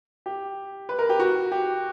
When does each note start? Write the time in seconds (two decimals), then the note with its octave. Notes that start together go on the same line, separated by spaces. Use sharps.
0.26 G4
0.89 B4
0.99 A#4
1.09 G4
1.19 F#4
1.52 G4